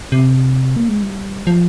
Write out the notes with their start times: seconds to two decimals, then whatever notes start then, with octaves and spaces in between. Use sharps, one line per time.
0.12 C3
0.76 A#3
0.89 G#3
1.02 G3
1.47 F3